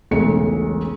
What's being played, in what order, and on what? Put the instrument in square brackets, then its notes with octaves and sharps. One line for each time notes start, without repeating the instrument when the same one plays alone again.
[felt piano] E1 B1 C#3 G#3 A3 C#7